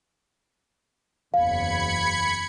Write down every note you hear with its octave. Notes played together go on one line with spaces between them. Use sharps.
F#1 E2 F5 B5 G#6 C#7